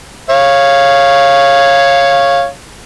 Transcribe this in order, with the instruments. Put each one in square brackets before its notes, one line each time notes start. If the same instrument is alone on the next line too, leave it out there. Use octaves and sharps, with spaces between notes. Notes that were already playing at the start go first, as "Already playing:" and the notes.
[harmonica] C#5 F5